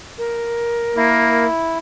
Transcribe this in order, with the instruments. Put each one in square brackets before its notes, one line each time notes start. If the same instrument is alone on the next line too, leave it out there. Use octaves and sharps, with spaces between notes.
[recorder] A#4
[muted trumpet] A#3 [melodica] E4